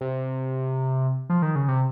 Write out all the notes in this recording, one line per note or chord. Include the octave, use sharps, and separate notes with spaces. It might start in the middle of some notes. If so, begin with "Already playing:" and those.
C3
F3
D#3
C#3
C3